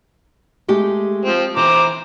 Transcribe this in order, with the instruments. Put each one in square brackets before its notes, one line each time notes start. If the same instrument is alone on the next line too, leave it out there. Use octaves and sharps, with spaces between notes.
[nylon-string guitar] G#3 A3 G4
[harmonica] F3 C4
[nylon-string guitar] E3 [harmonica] C5 A#5 D6